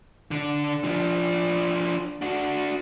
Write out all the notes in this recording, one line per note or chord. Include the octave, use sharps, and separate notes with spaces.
D3 D4
F3 D4
D4 F#4